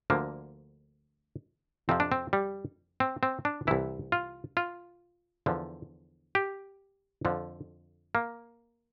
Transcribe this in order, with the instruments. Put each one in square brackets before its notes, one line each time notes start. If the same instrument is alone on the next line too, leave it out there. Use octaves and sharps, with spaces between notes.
[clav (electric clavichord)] D2 D3 F3 A#3
F2 C3 F3 C4
D4
C4
G3
C4
C4
D4
C2 C3 E3 E4
F4
F4
E2 D3 F3
G4
F2 D3 F3
A#3